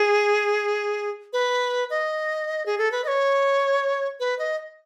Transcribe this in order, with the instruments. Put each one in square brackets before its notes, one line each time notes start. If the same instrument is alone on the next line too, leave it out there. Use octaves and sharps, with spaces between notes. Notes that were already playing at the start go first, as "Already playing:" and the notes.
Already playing: [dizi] G#4
B4
D#5
G#4
A4
B4
D#5
C#5
B4
D#5